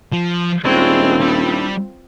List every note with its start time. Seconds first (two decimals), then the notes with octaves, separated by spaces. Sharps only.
0.12 F3
0.65 D#1 G#3 C4 D4 E4 F4 C#5
1.21 G3